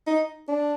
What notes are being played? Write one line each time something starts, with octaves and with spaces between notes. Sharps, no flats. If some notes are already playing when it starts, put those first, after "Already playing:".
D#4
D4